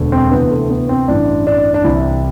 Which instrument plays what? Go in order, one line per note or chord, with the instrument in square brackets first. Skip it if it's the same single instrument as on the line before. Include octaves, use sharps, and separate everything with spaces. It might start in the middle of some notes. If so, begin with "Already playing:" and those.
Already playing: [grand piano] E1 D2 D3
C4
D2 C3 E3 B3
A3
B3
C4
A1 G2 E3 D4
D4
D4
C2 C3 E3 E4